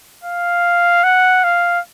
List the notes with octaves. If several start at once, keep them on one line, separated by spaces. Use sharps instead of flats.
F5
F#5
F5